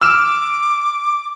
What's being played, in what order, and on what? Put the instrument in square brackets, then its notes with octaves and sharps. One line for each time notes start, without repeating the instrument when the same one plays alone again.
[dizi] D6 [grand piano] E6 F6 E7